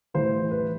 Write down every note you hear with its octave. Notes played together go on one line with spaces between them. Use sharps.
A2 E3 G3 C5
B4